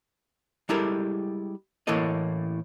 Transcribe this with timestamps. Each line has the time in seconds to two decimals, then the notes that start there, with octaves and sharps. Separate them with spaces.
0.69 G3 G#3 E4 G4 A4 A#4
1.87 A2 E3 A#3 E4 A4 D#5